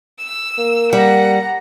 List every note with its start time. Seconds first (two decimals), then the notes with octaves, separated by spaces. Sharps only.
0.18 E6
0.58 A#3
0.93 G3 F#5 A#5